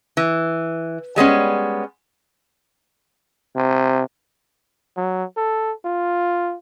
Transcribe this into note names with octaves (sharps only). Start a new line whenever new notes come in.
E3
G3 G#3 B3 C#4
C3
F#3
A4
F4